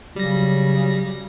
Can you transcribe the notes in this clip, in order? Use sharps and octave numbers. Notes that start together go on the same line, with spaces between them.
C#3 F#3 G3 A#6